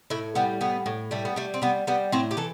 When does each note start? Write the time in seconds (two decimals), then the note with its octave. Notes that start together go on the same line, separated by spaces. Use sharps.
0.10 A2 E4
0.35 G3 B3
0.61 A2 B3
0.86 A2
1.11 G3 A3
1.25 B3
1.36 G3 A3
1.54 C4
1.62 G3 B3
1.87 G3 B3
2.12 A2 C4
2.31 G4
2.37 E3 A4